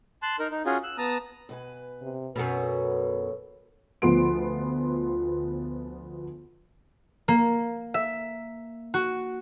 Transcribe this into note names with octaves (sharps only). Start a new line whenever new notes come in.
A5 C6 F#6
D#4 A#4
D#4
C#4 F4 F#4 G#4
E6 F#6
B3 A5 A#5 D#6
B2 B4 G#5
C3
F#2 B2 A4 B4 C#5 F#5
D2 F3 B3 C6 D7
A#3
E5
F#4